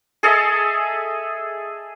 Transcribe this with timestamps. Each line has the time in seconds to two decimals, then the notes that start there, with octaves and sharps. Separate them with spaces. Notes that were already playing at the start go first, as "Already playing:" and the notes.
0.23 G#4 A4 D#5 E5